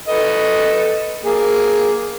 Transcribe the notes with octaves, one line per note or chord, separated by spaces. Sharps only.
A4 B4 D#5
A#3 G#4